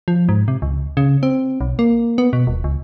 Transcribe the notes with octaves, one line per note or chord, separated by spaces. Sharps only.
F3
G#2
C3
C#2
C#3
C4
B1
A#3
B3
B2
D#1
C#2